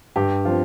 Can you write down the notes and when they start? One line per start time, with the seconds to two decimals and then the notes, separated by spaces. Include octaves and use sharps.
0.16 G2 G4
0.45 F3 F4
0.49 C4